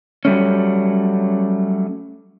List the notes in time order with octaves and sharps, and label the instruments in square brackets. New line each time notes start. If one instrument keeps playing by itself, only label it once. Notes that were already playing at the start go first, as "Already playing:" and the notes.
[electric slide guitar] F#3 G3 A3 C#4